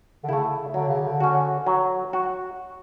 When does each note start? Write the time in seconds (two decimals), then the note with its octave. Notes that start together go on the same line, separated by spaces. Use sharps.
0.24 D3
0.29 C#3 A3 E4
0.74 D3 F#3
0.88 C#3
1.02 D3
1.20 C#4 F#4
1.67 F#3
2.13 F#4